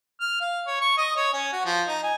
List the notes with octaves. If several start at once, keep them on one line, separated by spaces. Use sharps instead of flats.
F6
F5
C#5
C#6
D#5
C#5
C#4
F#4
F3
D#4
G#5